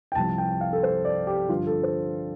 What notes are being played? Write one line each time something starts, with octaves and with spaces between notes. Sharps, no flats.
G5
C2 C3 F3 A5
G5
F5
A4
C5
D5
G4
G2 D3 F3 F4
A4
C5